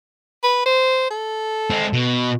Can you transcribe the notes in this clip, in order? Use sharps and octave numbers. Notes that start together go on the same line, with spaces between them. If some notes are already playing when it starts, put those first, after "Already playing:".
B4
C5
A4
G#3 C4
B2